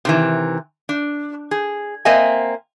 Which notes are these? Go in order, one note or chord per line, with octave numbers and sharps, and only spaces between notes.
C3 D#3 E3
D4
G#4
A#3 C4 D#5 E5 G#5